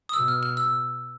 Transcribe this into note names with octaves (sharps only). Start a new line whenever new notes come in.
D#6
B2 E6
F6
F6
E6